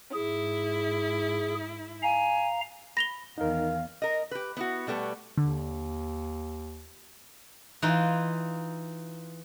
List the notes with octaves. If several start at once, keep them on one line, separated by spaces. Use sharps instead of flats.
G#2 E4 G#4
F5 G#5 A#5
B5 A#6 F7 G7
E2 D#3 D#4 A#4 F5
A#4 D#5
G4 B4
B3 E4 F#4
B2 G3 A3 B3
D#2 D3
E3 D#4 F4